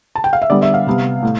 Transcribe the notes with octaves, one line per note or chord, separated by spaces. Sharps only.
A5
G5
F5
E5
D3 G3 B3 D5
E5
F5
C3 G3 B3
A2